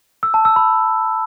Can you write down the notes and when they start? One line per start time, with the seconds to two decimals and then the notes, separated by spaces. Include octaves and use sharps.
0.23 E6
0.34 A5
0.45 E6
0.56 B5